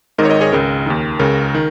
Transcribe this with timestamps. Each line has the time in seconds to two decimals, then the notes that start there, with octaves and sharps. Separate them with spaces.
0.18 G#1 G#2 D#3 A#4 D#5
0.25 C#5
0.30 A#4 D#5
0.41 G#4 C#5
0.52 C#2 C#3 A#4
0.86 D#2 D#3
1.19 C#2 C#3 A#4
1.54 D#3